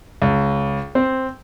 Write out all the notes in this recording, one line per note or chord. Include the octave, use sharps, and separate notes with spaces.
C#2
C4